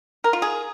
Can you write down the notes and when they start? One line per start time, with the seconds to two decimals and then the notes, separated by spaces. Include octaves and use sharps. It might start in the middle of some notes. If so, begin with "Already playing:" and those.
0.24 A#4
0.33 F4
0.42 G#4